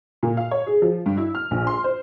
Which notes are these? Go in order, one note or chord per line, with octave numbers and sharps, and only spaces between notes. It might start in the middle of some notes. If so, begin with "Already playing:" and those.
A#2
F5
C#5
G#4
F3
G2
E4
F6
A#1
C6
C5